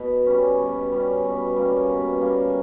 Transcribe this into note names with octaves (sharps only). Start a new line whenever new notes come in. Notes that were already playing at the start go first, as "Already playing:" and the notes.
Already playing: B2
G3 C#4
B2
G3 C#4
B2
G3 A#3 C#4
B2
G3 A#3 C#4